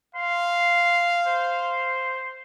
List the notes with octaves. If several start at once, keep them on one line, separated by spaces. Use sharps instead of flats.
F5 C6
C5